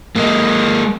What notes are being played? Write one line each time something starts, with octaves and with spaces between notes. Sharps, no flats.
G#3 A#3